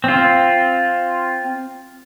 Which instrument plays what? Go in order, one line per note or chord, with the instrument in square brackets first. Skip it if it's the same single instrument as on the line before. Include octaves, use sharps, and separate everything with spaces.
[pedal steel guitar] C4 F4